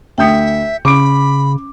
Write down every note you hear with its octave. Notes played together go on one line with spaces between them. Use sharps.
D2 E5 G5 D#6 G6 C#7
C#3 C#4 B5 D6 D7